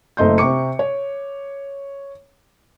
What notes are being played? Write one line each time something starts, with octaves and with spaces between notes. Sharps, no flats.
F#1 A3 D#5 C6 G6
C3 C#6 D6 C#7
C#5